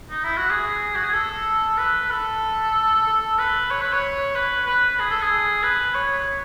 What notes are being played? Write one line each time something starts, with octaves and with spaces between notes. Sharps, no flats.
D#4
E4
F#4
G#4
F#4
G#4
A4
B4
A4
A4
B4
C#5
B4
C#5
B4
B4
G#4
A4
G#4
B4
C#5